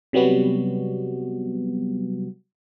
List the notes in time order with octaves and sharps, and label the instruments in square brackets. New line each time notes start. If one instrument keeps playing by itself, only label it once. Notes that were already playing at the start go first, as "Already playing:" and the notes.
[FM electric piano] C3 F#3 G3 B3 F#4